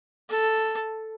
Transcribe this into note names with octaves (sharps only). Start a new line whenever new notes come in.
A4